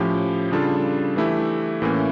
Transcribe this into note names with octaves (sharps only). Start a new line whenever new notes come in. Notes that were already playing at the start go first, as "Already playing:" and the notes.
Already playing: A2 F3 C#4 G4
C#3 G3 D4 F4 A4
E3 A3 E4 G4
A2 E3 A#3 C#4